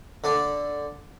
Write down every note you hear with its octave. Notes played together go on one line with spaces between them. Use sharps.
D3 D4